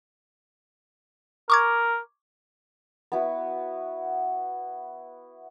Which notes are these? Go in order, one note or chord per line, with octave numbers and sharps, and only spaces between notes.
A#4 C#6 D6 G#6
B3 E4 F#4